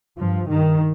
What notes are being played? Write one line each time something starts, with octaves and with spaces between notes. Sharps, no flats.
G2 F3
G2 D#3